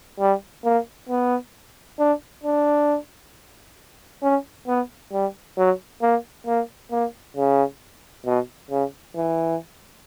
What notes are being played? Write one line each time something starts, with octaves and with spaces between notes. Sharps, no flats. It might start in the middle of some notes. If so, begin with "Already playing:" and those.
G3
A#3
B3
D4
D4
C#4
B3
G3
F#3
A#3
A#3
A#3
C#3
B2
C#3
E3